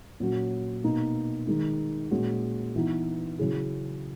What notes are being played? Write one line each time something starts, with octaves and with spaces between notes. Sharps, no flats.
A#2 F#3 C#4 F#4
B2 A#3 D#4
D#3 G#3 D#4
A#2 G#3 C#4 F#4
E3 B3 D#4
C#3 F#3 C#4 E4 G#4